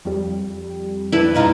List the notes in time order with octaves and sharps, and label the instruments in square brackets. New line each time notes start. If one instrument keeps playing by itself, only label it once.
[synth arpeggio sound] F2 G3
[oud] D4 [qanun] E4 B4
[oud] G2 D#4 F4